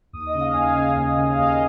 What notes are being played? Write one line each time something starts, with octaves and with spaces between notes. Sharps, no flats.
D#2 D#6
D#5
C#3
F5
D#2 G#5
F5
C#3
D#2
C#3
F5
D#2 D#5